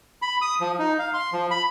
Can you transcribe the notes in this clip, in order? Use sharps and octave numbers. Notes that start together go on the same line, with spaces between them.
B5
D#6
F3
D#4
F5
C6
F3
B5